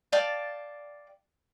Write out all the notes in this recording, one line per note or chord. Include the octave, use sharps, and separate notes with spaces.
D5 F5 G5 A5